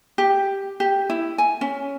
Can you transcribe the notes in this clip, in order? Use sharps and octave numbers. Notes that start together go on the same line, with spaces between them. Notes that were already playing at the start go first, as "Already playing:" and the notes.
G4
G4
E4
G#5
C#4